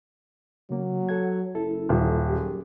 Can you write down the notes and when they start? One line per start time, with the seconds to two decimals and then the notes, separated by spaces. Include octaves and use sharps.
0.70 C#3 F#3 A#3
1.09 A4 F#5 G#6
1.55 F#1 E4 A4
1.89 D#1
2.28 F#2 G4 G#4